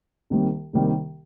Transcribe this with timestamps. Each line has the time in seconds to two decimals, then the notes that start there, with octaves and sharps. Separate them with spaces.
0.30 C2 C3 D#3 G3 A#3
0.73 C2 C3 D#3 G3 A#3